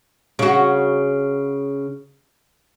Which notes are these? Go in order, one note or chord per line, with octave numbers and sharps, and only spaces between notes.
C#3 F#4